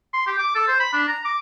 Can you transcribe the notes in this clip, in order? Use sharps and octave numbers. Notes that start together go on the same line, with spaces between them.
C6
G4
D6
A4
C5
B5
D4
A#5
D6